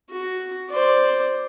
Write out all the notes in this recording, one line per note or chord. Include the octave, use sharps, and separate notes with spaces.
F#4
C5 D5